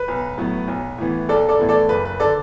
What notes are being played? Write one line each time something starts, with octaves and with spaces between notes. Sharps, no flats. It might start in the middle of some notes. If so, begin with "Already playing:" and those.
Already playing: B4
B1
A2 F#3 B3
B1
A2 E3 B3
B1 A4 D5
A4 D5
A2 E3 B3
A4 D5
F#1 B4
B4
D3 A4 D5